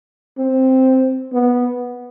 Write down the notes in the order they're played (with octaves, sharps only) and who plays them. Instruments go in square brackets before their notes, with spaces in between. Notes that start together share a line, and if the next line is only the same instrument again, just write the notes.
[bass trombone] C4
B3